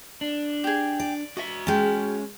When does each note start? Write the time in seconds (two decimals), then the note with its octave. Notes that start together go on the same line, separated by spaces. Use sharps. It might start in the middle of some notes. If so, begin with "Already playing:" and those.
0.21 D4
0.64 G4 G#4
1.00 D5
1.37 F#4 D#5 E5 A5
1.67 G#3 C#4 G5 A5